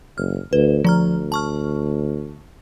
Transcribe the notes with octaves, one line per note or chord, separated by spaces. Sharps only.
F#1 F6
D2 B4
D2 F3 A#5 F6
A5 C#6 F6